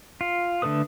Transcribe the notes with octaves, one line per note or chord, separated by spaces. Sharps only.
F4
D3 A3 A4 B4 D#6